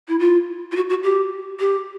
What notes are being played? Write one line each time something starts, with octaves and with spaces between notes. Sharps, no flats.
E4
F4
F4
F#4
F#4
G4
G4